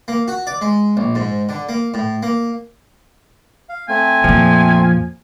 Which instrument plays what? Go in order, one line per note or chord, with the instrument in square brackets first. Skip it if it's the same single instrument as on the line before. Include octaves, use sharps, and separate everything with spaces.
[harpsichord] A#3
F#4
D5
G#3
A#1
G#2
D3
A#3
A2
A#3
[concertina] F5
[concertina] A3 C4 [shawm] G#5
[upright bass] F2 A#2 [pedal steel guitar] F3